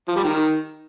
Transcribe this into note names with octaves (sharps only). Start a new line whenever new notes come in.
F3
G3
D#3